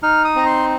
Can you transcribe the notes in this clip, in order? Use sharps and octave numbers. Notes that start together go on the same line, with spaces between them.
D#4 F6
D#6
C4 A#5
C6